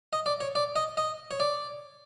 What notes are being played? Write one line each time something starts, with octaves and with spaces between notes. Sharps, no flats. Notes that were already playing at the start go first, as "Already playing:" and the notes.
D#5
D5
C#5
D5
D#5
D#5
C#5
D5